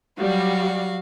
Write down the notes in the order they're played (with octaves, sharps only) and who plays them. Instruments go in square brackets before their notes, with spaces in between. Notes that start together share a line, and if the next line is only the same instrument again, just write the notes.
[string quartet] F#3 F#4 F5 [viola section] G3